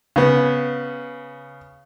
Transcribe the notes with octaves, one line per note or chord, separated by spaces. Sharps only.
C#3 B3